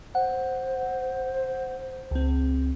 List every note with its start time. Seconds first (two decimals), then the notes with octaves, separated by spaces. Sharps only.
0.15 C5 F#5
2.11 C#2 C4